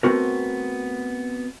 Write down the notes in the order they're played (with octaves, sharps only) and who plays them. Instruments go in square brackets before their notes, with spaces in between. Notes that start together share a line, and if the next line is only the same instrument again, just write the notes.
[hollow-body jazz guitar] A3 B3 C4 F#4 A#4